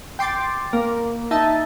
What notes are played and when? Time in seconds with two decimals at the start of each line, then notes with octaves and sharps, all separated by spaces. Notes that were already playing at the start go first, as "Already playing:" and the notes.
0.19 G5 C6 D6 A6
0.73 A#3
1.31 D#4 E5 A5